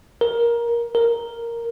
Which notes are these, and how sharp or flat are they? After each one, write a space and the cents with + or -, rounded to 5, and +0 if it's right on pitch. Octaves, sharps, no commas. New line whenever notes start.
A#4 +15
A#4 +0